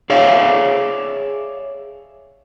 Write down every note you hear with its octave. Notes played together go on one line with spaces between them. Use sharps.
G#4 C#5 D5 E5 F5